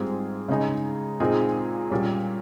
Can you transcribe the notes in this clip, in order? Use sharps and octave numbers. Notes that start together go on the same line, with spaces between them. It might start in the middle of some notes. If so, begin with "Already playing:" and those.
Already playing: G#2 G3 C4 F4 G#4
C#3 G#3 D#4 G#4
A#2 G#3 C4 D#4 G#4
A#2 G3 C#4